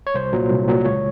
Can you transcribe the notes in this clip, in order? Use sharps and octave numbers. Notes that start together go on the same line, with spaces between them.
C#5
C2 C5
A#2 F#3
C2
A#2 F#3
C#2 C#5